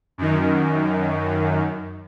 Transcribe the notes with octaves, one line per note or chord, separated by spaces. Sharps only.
F#2 D#3